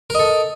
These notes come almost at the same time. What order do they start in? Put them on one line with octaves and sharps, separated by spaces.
A#4 D#5 A4